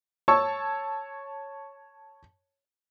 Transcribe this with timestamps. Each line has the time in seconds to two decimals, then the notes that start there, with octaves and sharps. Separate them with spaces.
0.28 C#5 A5 C#6 E6